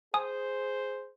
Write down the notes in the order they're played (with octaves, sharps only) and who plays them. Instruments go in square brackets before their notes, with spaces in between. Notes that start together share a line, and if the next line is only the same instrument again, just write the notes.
[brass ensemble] G#4 C5 [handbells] G#5 D#6